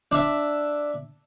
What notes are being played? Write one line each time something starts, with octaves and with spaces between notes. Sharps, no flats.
D4 E5